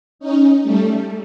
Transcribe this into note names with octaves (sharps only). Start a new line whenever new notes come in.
C#4 D#4
G3 A3